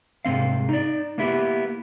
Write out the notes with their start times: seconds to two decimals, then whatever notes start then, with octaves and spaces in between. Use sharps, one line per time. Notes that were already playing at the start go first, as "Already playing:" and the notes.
0.25 C2 G#2 D#3 C4 F5
0.69 D#4 D5
1.18 A#3 B3 E4 G4